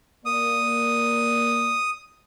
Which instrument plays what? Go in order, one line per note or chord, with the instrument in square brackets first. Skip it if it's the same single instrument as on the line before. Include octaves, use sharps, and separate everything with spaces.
[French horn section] A#3 D5 [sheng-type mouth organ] D#6